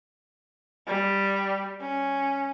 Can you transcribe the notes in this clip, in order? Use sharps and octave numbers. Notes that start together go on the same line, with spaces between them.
G3
C#4